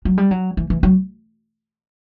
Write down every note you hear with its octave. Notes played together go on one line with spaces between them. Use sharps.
F#3
G3
F#3
E3
E3
F#3